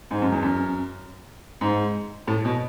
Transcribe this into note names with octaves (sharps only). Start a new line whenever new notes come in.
G#2
F#2
E2
F#2
G#2
A2
B2